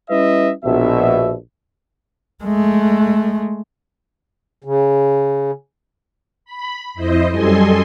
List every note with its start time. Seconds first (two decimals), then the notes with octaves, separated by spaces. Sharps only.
0.10 G3 C#4 E4 B4 D#5 E5
0.65 A#1 B2 E5
2.44 G#3 A3
4.64 C#3
6.45 B5
6.94 F2 E4 C5 D#5
7.31 F#2 G3 A4 D#5 G#5 C6